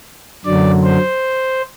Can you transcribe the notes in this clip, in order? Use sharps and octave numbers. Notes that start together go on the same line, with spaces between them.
F#2 D3 F#3 D5
C5